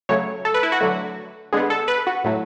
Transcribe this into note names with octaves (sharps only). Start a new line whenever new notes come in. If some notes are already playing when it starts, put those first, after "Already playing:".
C#3 F#3 A3 C#5
A4
B4
E4
F#4
D3 F#3 A3
D3 G#3 B3 G#4
A4
B4
F#4
A2 F#3 A3